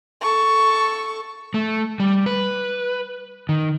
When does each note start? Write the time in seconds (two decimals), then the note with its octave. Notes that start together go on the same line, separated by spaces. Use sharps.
0.21 A4 C#6
1.54 A3
2.00 G3
2.26 B4
3.49 D#3